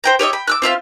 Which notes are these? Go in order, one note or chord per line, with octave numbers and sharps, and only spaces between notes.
C5 G5 A#5
G4 C#5 D#5 E5
G5 B5
D6 E6 F#6
C4 F4 E5 F5